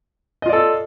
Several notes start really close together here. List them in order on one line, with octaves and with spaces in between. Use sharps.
D#5 F4 D5 A4